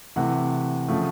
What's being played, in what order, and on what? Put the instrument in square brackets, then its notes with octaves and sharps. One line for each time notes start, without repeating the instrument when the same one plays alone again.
[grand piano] C3 E3 A3 F#5
C#3 F3 A3